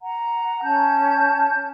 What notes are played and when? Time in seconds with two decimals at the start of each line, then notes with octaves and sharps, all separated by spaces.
0.01 F#5 A#5
0.63 C#4 A5 G6